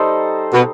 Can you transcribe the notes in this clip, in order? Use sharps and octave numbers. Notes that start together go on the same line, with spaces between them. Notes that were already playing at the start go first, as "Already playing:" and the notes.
Already playing: G3 D#4 A4 C5
B2